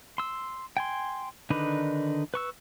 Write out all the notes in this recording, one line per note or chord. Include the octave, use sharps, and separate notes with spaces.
C6 E6
G5 G#5 C6
D3 D#3 D4 D#4 B4
B4 C#6 E6